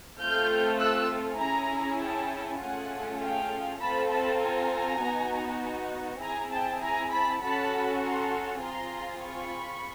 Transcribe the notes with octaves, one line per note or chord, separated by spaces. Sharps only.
A3 C4 F4 A4 F6 G6
E6 F#6
C#4 E4 G#4 G#5 A#5
G5 A5
A3 C#4 F4 G#4 F#5 G#5
F5 G5
C4 F4 A4 A5 B5
A5 B5
G#5 A#5
B3 D#4 F#4
C4 E4 G#4 G#5 A#5
G5 A5
G#5 A#5
A5 B5
C#4 F#4 A4 A5 B5
A#5 C6
C4 F4 G#4 A#5 C6
B5 C#6